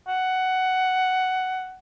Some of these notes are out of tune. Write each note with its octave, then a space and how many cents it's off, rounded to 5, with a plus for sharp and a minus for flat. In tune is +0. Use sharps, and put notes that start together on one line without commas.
F#5 +10